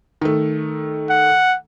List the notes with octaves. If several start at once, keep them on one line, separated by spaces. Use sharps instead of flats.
D#3 A3
F#5